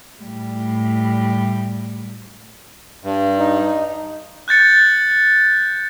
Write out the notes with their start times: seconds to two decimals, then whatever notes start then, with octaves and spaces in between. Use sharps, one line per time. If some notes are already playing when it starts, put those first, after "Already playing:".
0.23 A2 G3
3.04 G2
3.39 D#4
4.48 F#6 G6 A6 C#7